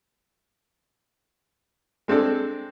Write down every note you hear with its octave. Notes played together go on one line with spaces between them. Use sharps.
G#3 C4 D4 A4